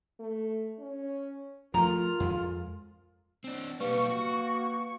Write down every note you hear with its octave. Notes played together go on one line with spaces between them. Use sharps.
A3
C#4
F3 G#3 A3 F4 A#4 A#5
F2 G#3
C4 D4
B1 G3 A#3 B4 F5 C#6
F#4